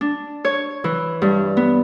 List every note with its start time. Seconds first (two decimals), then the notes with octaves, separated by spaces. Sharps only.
0.01 D4
0.45 C#5
0.84 E3
1.22 G2
1.57 B3